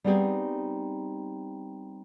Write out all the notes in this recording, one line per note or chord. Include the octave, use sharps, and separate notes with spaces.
G3 B3 C4 D#4 G4 G#4